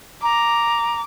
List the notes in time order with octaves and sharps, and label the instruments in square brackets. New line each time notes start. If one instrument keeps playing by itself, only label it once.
[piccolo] A#5 [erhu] D6